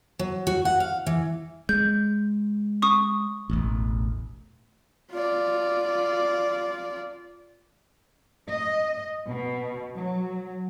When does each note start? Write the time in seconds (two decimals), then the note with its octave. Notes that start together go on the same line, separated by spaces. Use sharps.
0.19 F#3
0.47 F#4
0.65 F#5
0.80 F5
1.06 E3
1.69 G#3 G6
2.82 C#6 D#6
3.50 E1 A1
5.11 F4 D5
8.49 D#5
9.28 B2
9.96 F#3